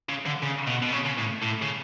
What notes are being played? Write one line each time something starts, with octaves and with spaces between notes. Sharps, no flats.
C#3
D3
C#3
B2
B2
C#3
C#3
A2
A2
C#3